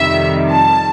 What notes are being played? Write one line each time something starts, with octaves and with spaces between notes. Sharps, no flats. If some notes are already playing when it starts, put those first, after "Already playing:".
Already playing: F2 C3 D#3 G3 E5
A5